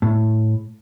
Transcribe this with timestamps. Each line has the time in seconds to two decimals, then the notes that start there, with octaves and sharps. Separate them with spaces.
0.02 A2